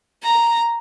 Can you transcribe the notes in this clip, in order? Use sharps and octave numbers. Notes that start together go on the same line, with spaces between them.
A#5